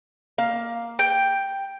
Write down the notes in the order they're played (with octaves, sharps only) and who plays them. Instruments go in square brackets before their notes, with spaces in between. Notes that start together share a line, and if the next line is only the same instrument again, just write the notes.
[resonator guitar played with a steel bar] A#3 F5
[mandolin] G5